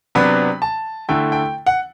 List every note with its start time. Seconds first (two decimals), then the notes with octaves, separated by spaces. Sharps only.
0.15 C3 F#3 B3 D4 B5
0.62 A5
1.09 D3 A3 E4 G5
1.32 G5
1.66 F#5